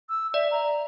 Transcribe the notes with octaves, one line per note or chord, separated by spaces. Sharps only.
E6
D5 E5
A#5